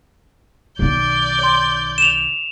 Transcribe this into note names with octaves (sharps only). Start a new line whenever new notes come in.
B1 D#3 D5 G6
C#5 C6
E7 F7